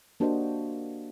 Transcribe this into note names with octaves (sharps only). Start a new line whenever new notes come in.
A#3 D4 F#4 G4 C5 D#5